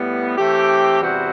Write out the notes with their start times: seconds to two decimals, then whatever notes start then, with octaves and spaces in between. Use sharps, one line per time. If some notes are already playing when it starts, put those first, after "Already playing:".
Already playing: A2 G3 B3
0.37 E3 A3 C4 G4
1.02 E2 C3 G3 C4 F#4